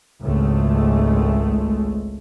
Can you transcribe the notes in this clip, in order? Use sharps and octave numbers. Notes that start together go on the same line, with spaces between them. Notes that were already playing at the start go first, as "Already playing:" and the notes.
G#1 C#2 G#3 A3